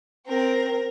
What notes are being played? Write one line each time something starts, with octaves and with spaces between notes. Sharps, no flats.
C4 A#4